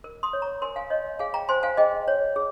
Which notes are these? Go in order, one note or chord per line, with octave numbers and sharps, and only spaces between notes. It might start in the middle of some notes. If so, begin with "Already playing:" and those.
A#4
C6 D#6
C#5
A#5 C#6
A#4 G#5 C6
F5 G#5
C#5 D#5
G#4 F5 G#5
G5 A#5
C5 G#5 C6
F5 G#5
G#4 D#5 G5
C#5
G#4